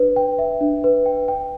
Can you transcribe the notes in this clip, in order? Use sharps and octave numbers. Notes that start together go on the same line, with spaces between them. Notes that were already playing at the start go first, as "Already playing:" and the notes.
Already playing: D4 B4
G5
E5
D4
B4
G5
G5